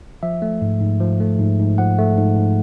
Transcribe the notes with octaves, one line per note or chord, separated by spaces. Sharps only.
F3 E5
A3
G#2
G#2
F3
A3
G#2
G#2
F3 F#5
A3
G#2
G#2